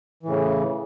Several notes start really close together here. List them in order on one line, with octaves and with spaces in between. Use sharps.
E3 A2 C#3